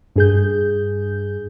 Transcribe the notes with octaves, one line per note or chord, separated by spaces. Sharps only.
G2 G#4 G6